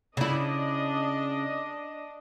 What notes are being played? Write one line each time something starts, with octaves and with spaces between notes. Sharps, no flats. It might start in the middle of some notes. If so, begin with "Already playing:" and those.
C#3 D4 E4 D#5